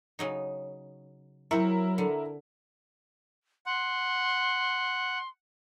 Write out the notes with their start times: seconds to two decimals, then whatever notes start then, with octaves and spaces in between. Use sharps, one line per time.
0.19 C#3 F#3 D#4
1.51 F#3 C4 E4 F#4 A#4
1.98 D3
3.66 F#5 C6